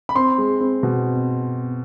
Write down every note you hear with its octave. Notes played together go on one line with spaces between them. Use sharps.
B5
C4 C6
G#3
C4
B2